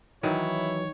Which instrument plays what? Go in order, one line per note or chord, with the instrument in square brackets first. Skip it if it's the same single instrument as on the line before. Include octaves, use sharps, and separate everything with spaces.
[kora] D#3 [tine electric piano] E3 F#3 [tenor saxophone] E4 [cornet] C#5